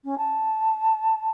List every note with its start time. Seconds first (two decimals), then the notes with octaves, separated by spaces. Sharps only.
0.04 C#4
0.18 A5